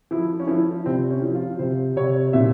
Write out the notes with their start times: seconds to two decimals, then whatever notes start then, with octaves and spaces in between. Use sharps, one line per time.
0.11 F3 E4
0.40 C#4
0.48 F3 E4
0.86 C3 C4
1.10 C#4
1.22 F3
1.35 F4
1.59 C3 C5
1.96 C3 C#5
2.33 A#2 E5